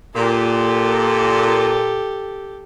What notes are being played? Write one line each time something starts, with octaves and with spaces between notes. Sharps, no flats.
A#2 G4 A4